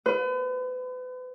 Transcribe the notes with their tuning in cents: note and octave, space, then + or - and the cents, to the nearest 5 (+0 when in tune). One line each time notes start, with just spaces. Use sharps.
B4 +40